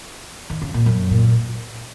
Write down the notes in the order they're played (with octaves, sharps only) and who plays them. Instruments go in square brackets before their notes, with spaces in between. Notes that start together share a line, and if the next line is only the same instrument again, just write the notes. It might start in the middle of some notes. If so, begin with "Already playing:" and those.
[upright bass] D#3
C#3
A#2
F#2
A#2